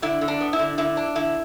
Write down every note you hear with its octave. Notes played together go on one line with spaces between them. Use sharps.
D3 E4
D3
D4
B3
E4
D3
D3 E4
D4
D3 E4